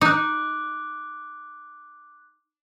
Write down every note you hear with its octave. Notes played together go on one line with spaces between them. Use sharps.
D#4 D6 F#6